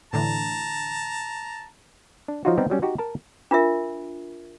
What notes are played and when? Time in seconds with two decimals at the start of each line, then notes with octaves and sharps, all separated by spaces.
0.13 A2 D3 E3 A5 A#5
2.28 D4
2.45 F3 F#3 D#4 F4 F#4
2.58 G3 B3 C4 D#4 G4
2.70 F#3 G3 C#4
2.82 D#4 F#4 G4
2.98 A#4 A5 A#5
3.51 D4 F4 A#4 E5